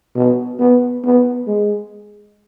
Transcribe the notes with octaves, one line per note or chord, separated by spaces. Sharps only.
B2
B3
B3
G#3